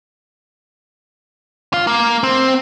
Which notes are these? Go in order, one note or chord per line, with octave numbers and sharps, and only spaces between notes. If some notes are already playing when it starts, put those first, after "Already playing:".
F4
A#3
C4